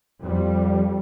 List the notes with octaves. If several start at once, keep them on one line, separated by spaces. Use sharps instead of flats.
F2 G3